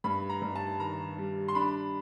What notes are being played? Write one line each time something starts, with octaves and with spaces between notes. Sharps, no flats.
G2 B5
A#5
G2
A5
D#3 A#5
G3
C6
D4 B5